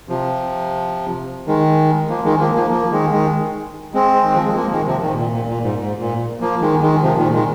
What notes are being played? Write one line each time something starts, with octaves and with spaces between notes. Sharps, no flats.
C3 F3
D#3 G#3
F3 A#3
D#3 G#3
F3 A#3
F3 A#3
F3 A#3
D#3 G#3
D#3 G#3
G#3 C4
D#3
F3
G#3
F3 A#3
D#3 G#3
C3 F3
A#2 D#3
A#2
A#2
A#2
G#2
G#2
A#2
F3 A#3
D#3 G#3
D#3 G#3
C3 F3
A#2 D#3
D#3 G#3